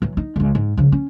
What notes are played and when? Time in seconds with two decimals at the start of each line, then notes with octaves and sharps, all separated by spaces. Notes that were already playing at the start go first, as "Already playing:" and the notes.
0.02 E3 F#3
0.17 D#4
0.36 D#1 C#2
0.55 G#2
0.77 C#3 F3
0.92 C#4